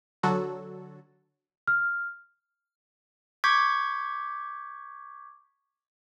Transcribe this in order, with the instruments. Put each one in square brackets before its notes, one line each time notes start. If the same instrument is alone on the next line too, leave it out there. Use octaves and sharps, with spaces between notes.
[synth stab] D3 F#3 F#4 A4
[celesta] F6
[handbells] C#6 D6 G6 G#6 B6